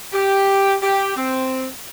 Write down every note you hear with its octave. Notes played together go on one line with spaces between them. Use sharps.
G4
G4
C4